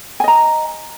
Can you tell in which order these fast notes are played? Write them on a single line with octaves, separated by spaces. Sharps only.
G#5 D#5 A#5